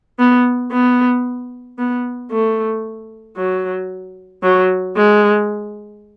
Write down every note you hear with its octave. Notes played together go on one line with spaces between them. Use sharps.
B3
B3
B3
A3
F#3
F#3
G#3